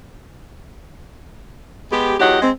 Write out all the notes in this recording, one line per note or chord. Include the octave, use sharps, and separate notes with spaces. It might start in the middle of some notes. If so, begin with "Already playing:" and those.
G#3 B3 G4
E2 F#3 G4 D#5 F#5
G#3 C4